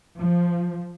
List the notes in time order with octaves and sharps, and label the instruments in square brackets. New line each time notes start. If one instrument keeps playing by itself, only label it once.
[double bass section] F3